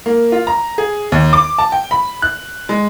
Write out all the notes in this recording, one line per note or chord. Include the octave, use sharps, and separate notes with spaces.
A#3
F4
A#5
G#4
D#2
D6
A5
G5
B5
F#6
G#3